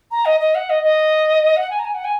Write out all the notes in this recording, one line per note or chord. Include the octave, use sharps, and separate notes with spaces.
A#5
D#5
D#5
F#5
D#5
D#5
F#5
G#5
A#5
G#5
F#5
G#5